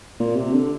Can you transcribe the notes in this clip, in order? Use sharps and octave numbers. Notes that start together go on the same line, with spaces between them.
A#2
C3
D3